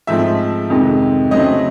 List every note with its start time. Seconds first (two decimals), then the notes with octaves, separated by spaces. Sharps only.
0.07 G#2 F3 A3 C4 E5
0.70 F2 C3 D#3 G#3
1.31 C#3 F#3 A3 C4 D#5